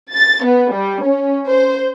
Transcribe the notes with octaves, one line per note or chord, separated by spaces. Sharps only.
A6
B3
G3
C#4
C5